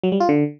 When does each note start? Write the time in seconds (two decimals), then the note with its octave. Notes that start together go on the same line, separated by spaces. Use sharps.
0.03 F#3
0.12 G3
0.20 F4
0.29 D3